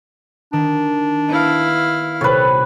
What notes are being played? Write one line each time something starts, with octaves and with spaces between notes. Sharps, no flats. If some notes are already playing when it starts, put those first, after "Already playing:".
D#3 D4
B3 E4 F5
D#1 C3 A4 B4 C#5